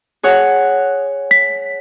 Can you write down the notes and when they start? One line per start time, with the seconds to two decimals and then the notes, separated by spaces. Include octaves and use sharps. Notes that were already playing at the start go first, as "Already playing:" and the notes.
0.23 G#4 C#5 F#5
1.31 B6